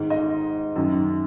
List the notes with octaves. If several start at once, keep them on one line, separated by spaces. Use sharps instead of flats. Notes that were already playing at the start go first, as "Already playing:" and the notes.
Already playing: G#2 D#3
D#5
F#2 D#3